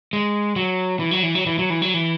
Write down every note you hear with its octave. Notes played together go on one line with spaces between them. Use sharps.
G#3
F#3
E3
F#3
E3
F#3
E3
F#3
E3
F#3
E3